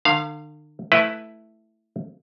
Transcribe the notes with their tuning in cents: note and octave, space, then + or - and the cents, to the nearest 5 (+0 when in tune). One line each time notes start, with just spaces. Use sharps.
D3 +45 F5 +0
A3 +0 E4 +0 B4 +0